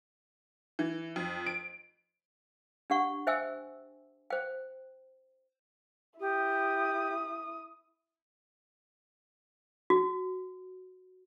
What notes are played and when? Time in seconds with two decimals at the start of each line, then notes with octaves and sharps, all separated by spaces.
0.79 E3
1.16 F2
1.46 D7
2.90 D4 G4 F#5 C#6
3.27 C5 E5 G5 G#5 E6
4.30 C5 G5
6.20 E4 G4 D#6
9.90 F#4